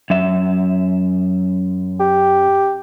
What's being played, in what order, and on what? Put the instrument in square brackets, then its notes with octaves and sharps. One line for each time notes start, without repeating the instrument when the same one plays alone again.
[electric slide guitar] F#2 E5
[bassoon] G4